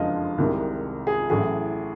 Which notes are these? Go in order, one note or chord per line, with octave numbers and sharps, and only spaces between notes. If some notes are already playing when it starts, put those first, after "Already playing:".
Already playing: F#1 F2 D3 F3 G#3 D#5 F5
C2 C3 D#3 G#3
G#4
A1 A2 F#3 G#4